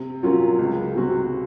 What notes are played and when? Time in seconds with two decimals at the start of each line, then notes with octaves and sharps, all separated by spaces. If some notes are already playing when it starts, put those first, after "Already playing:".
Already playing: C3
0.23 F#3 C#4 F4 A#4
0.59 C#2
0.95 C3 F#3 C4 F#4